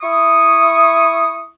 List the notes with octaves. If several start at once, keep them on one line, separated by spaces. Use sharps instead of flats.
E4 C#6 D#6